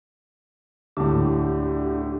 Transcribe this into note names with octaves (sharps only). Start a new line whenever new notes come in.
D2 A2 D4 G4